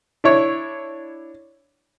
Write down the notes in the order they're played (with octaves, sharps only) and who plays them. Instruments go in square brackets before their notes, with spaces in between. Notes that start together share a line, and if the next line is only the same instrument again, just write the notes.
[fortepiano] D4 E4 C#5